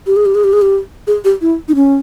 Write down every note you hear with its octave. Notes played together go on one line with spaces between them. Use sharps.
G4
G#4
G4
G#4
G4
G#4
G4
G#4
G4
E4
D#4
C#4